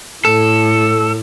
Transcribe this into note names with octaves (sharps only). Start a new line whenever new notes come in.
A2 A4